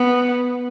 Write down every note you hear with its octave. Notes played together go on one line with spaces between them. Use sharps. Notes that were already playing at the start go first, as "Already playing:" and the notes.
Already playing: B3